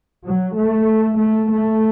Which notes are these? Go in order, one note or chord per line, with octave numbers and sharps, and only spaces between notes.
F#3
A3
A3
A3